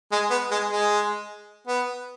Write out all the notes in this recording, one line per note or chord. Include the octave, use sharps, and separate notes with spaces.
G#3
B3
G#3
G#3
B3